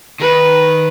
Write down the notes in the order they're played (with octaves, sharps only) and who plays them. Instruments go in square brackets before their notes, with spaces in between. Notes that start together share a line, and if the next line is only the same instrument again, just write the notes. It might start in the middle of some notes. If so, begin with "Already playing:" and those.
[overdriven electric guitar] D#3 [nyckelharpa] B4